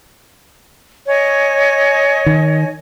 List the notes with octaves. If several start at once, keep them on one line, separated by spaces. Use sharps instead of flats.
C#5 D#5 G#5
D#3